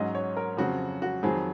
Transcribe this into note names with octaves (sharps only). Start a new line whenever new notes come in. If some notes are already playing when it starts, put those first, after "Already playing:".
Already playing: G#2 F#3 C#4 D#5
C#5
A#4
F2 C#3 F#3 C4 F#4
F#4
F2 D#3 F#3 C4 G#4